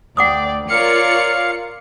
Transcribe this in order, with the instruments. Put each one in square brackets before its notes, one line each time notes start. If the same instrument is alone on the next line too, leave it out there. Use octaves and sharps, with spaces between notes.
[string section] D2 [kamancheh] D5 G5 [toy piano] F#5 D6 D#6
[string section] F4 A#4 C#7 [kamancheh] C#5 D5 [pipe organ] F5